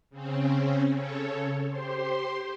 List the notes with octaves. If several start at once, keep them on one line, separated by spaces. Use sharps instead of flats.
C#3 C4 C#4
C#3 A4 C#5
G4 C5 C6